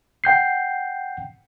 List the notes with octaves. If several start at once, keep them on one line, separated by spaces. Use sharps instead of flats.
F#5 G5 G6 C7